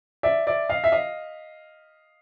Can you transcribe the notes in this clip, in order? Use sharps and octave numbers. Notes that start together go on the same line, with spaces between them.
D5 E5
D5 E5
D#5 F5
E5
D#5 F5